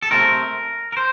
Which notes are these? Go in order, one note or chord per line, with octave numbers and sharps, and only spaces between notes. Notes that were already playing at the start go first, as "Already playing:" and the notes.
A4
C3 D#3 A3 C4 A#4
A#4
C5